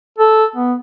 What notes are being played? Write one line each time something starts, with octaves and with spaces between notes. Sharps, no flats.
A4
B3